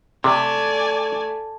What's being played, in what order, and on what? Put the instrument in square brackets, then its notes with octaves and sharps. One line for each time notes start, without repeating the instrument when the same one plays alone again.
[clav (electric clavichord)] C3 [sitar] A3 [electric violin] D5 G#5